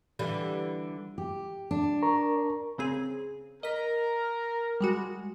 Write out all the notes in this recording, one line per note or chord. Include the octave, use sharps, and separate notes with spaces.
D3 E3 G3
G4
D4
A#4 A#5 C#6
C#3 C4 G#4
A#4 D#5 B6
G3 G#3 F#4